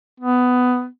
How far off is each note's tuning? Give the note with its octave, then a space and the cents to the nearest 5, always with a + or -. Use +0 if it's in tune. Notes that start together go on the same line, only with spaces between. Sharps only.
B3 +15